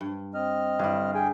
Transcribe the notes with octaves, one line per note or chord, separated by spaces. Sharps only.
G2
C4 D#5 F6
G2 D3 E4
G#4 G5 G#5